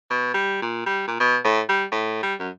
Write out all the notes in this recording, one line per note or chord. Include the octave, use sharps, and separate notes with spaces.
B2
G3
A#2
G3
A#2
B2
A2
G3
A2
G3
F#2